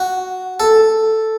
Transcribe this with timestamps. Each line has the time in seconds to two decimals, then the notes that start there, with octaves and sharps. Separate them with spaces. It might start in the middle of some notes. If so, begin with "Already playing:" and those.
Already playing: F#4
0.60 A4